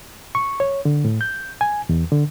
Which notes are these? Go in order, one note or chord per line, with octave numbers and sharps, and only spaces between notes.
C#6
C#5
D3
A2
G6
G#5
E2
D3